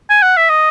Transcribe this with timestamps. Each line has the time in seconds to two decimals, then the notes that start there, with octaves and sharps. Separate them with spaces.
0.10 G#5
0.22 F#5
0.37 E5
0.50 D#5